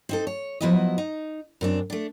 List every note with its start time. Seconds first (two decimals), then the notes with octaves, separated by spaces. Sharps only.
0.09 C4 D#4 A4
0.27 C#5
0.61 F3 F#3 B3 E4 F#4 D#5
0.98 D#4
1.61 F#2 C4 D4
1.90 A3 D4